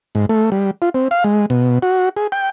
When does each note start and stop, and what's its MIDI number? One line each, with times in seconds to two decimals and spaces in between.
0.15 0.26 44
0.29 0.50 57
0.52 0.71 55
0.82 0.89 65
0.94 1.08 60
1.11 1.24 77
1.24 1.46 56
1.50 1.79 47
1.82 2.09 66
2.17 2.27 68
2.32 2.50 79